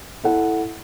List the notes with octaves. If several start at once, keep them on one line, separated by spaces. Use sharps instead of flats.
E4 A4 F#5